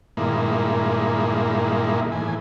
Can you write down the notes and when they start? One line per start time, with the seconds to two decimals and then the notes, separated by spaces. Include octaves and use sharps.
0.17 G2 A#2 D#3 G#3 A#3 E4
2.12 A2 E3 G#5